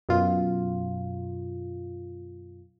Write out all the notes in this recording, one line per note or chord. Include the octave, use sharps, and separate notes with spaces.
F#2 B2 F4